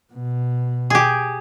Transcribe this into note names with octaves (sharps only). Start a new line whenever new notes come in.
B2
G4 G#4